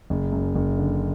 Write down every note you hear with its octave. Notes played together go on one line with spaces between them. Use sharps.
F#1
F#2
F#1
D3